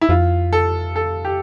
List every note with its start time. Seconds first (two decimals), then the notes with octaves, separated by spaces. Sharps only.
0.01 E4
0.09 F2 F4
0.53 A4
0.96 A4
1.25 G4